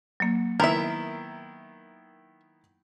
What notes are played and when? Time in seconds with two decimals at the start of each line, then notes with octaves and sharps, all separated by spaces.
0.20 F#3 A#3
0.60 D#3 B3 E4 A#4 E5